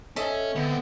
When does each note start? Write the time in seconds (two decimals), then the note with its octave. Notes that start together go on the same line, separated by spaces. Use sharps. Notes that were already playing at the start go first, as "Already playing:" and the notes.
0.16 C#4 A4 D#5 E5
0.55 D3 B3 C4